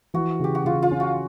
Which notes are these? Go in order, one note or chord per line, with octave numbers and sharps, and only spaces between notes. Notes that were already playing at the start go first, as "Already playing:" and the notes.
E3 F#4
C#3 G4
F#4
C#3 F4
F4
C#4
F#4